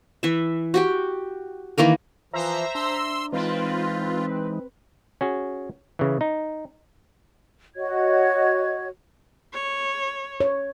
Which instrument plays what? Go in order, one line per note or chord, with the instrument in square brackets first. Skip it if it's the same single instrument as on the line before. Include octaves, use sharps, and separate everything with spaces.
[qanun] E3 E5
F#4 G4 G5
D#3 E3 A#3 A#4
[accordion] E3 F3 [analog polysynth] C5 E5 A#5
[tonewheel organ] D4 [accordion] C6 E6
[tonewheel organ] E3 G#3 D#4 [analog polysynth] C4 B4 [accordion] F4
[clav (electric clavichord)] C#4 F#4 G#4
C#3 E3
D#4
[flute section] F#4 C#5 D#5 G#6
[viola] C#5
[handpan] C#5